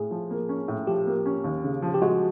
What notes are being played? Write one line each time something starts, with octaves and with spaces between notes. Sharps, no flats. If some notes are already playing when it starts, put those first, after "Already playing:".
Already playing: A2 G#4
F3
A#3
C#4
A2
F3 G4
A#3
C#4
D#2
C#3
F3
G4
G#3 F#4